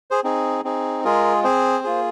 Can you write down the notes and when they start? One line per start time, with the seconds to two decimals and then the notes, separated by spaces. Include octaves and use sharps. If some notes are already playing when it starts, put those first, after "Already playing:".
0.11 G#4 C5
0.24 C4 D#4 G#4
0.64 C4 D#4 G#4
1.04 G#3 F4 G#4 A#4
1.44 C4 G#4 C5
1.84 A#3 F4 G#4